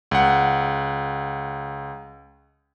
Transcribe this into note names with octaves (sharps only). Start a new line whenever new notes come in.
C#2 F#5